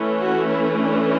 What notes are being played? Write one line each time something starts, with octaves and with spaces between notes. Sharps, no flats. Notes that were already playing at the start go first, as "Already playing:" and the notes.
Already playing: E3 A3 C#4
F#4
E4
D4